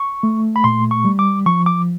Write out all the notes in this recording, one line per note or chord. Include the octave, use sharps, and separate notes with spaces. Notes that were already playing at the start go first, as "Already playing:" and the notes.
Already playing: C#6
A3
B5
A#2 C6
C#6
G3
D6
F3 C#6
D6